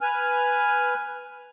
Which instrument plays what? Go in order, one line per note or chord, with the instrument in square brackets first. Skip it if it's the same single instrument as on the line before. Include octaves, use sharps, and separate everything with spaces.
[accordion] B4 G#5 F6